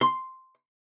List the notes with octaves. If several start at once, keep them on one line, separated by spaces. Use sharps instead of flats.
C6